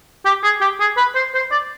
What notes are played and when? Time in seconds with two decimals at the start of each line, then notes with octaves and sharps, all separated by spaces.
0.25 G4
0.43 G#4
0.61 G4
0.80 G#4
0.97 B4
1.15 C5
1.34 C5
1.51 D5